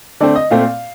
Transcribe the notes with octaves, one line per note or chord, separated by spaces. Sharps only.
D3 A3 C4 D5
D#5
A#2 A3 C4 F5